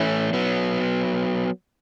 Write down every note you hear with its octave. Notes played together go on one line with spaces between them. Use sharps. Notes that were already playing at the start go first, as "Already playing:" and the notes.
Already playing: E3 A3 C#4 E4
F#3 B3